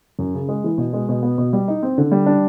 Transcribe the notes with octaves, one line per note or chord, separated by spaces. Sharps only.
F#2
C#3
G#3
E3
B2
G#3
B2
B3
B2
G3
D#4
C4
D3
G3
D4